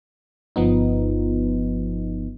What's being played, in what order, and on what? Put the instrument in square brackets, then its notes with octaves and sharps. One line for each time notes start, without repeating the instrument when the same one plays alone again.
[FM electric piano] G1 F3 B3 D#4